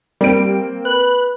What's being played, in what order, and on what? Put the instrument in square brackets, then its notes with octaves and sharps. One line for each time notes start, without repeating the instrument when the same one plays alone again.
[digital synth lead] G3 [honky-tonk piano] A#3 C4 D7
[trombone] B4 [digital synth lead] F#6